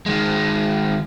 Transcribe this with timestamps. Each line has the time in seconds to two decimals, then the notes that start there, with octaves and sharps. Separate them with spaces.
0.06 D#3 G#3